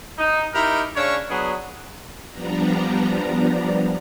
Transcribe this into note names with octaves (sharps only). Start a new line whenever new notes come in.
D#4
D#4 E4 G4 A#4
C#3 C#4 D4 C#5
F#3 B3 D4 G#4
F3 G3 B3 D4 A#5